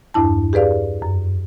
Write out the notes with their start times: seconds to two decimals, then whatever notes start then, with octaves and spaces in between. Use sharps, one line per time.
0.14 E2 G2 D4 E4 A5
0.53 G4 G#4 B4 D5 F5
1.02 F#2